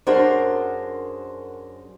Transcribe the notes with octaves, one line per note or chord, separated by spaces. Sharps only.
F#2 D4 G#4 A#4 C5 F#5